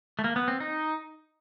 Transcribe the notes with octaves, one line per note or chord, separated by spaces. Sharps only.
A3
A#3
B3
C4
D#4